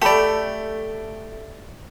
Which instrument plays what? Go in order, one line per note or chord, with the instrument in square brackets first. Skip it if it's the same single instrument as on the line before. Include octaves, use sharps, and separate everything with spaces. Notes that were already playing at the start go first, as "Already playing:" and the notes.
[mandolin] A3 [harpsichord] G4 D5 [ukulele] A5 B5